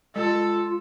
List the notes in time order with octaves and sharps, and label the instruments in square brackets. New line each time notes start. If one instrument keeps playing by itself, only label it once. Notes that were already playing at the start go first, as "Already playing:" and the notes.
[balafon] G#3 [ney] F4 [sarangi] A4